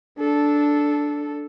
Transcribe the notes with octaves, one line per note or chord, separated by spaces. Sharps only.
D4 A4